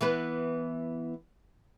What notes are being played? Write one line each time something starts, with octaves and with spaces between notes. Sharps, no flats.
E3 B3 B4